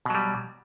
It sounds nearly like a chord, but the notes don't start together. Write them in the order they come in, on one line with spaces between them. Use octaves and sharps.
B2 F#3 G3